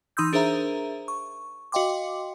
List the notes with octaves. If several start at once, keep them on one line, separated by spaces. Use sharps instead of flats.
E3 D#4 C6 D#6 E6 G6
D4 G#4 A#4 C5 E5 A#5
C#6
F#4 D#5 F5 G5 C6 D6